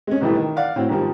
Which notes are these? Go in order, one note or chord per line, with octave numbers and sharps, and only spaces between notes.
G#3 C#4
G#2 B2 E3 G3 A3 E4
D#3
D5 F5 F#5
A2 C4 F#4
G#2 C3 D#3 F3 G3